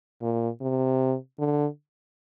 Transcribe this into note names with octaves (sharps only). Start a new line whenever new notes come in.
A#2
C3
D3